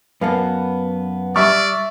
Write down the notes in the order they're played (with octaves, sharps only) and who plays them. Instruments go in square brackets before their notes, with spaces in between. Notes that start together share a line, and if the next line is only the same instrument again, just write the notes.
[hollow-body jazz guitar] F#2 A#3 B3 [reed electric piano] B4 F5 A5
[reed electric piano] G3 F6 [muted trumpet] D5 [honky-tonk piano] E5 C#6